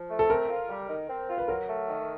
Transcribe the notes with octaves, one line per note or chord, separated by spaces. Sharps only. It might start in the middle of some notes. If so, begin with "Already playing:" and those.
Already playing: F3
A3
A4
C4 A#4
F4
G3
D#3
C4
F4
B4
F#3 A#4
A3
D#3